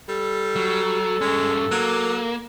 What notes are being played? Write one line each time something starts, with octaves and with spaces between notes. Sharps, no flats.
G3 A4
F#3
G2 G#3 C#4
F#3 A#3